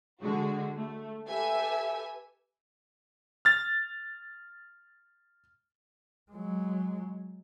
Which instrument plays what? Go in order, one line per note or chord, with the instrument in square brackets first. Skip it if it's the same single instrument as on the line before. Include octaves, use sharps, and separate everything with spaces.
[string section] D3 G#3 F#4
A3
G4 A4 B4 E5 G#5
[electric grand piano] F6 A6
[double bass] F#3 G#3